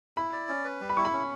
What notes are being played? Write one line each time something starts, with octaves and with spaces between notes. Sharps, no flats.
E4 B5
D5
C#4
B4
G3
B5
E4 C#6
B5
C#4